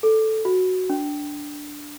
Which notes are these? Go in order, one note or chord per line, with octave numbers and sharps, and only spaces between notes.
A4
F#4
D4